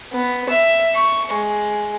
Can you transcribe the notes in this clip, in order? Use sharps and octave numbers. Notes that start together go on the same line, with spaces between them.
B3
E5
C#6
G#3